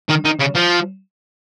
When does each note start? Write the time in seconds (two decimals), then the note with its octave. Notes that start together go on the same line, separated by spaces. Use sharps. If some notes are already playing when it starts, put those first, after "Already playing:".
0.09 D#3
0.25 D#3
0.40 C#3
0.56 F3